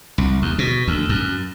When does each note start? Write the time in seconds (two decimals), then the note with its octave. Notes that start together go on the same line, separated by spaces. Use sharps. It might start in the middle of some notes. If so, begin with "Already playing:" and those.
0.18 C2
0.42 D#2
0.58 B2
0.88 D2
1.09 F#2